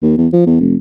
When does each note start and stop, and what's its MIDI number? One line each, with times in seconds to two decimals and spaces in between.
0.03 0.16 39
0.18 0.28 40
0.33 0.42 53
0.47 0.60 40
0.61 0.76 29